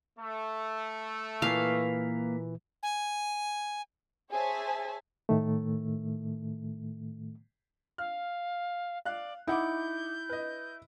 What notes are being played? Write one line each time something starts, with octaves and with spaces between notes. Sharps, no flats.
A3
A#2 E3 A#3 B4 F5 A5
G#5
G#4 C5 C#5 E5 G#5 A5
A2 D#3 A3
F5 F6
D5 F5 F#6
D#4 E4 F#5 D6 G6
B4 D#5